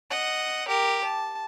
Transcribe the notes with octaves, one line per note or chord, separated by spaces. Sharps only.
D#5 F#5
G4 A#4
A5